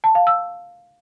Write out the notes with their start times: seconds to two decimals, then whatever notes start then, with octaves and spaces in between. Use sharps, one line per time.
0.04 A5
0.15 F5
0.27 E6